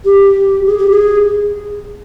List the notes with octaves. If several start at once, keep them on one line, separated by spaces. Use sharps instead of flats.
G4
G#4
G4
G#4